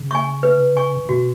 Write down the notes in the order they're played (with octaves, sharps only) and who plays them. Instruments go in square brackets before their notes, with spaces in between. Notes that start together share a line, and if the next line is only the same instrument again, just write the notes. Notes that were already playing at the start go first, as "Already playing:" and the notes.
Already playing: [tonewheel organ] C#3
[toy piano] G#5 C#6
B4
G#5 C#6
[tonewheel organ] C#3
[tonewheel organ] B2 [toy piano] F#4